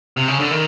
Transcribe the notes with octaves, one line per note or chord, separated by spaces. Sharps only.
C3
C#3
D3
D#3